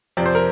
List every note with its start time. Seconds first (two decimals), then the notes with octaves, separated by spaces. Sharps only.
0.17 F2 C3 F3 C4 D5
0.26 C5
0.35 A#4